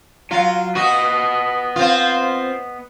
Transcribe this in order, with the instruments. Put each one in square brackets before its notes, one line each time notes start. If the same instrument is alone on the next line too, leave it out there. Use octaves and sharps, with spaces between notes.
[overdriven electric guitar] F#3 [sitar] F4
[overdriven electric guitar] B3 D#5 [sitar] F#4
[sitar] C4 F4